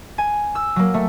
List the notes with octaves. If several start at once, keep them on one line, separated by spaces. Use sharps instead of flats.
G#5
E6
F#3 A#3
A3